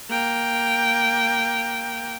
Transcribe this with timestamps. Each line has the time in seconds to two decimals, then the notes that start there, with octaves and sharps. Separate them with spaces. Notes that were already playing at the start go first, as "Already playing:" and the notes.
0.10 A#3 G5